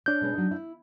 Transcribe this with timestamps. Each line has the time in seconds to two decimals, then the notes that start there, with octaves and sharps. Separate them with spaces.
0.06 D4 C#5 G6
0.21 B2 G#3 C#4
0.34 F#3 D#4
0.51 E4